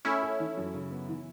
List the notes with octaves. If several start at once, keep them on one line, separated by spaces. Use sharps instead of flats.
A3 C#4 E4
A4
E3
F#2
C#3
B3
E3